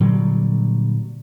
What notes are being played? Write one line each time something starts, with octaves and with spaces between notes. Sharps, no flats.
A#2 D3 F#3 G3